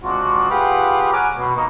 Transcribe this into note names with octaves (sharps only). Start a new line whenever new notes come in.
C3 G#3 D4 F4 F#4
F4 G4 G#4 B4 F5 F#5
C#5 F#5 G#5 A#5 D6 F6
B2
A#3 D#4 C#6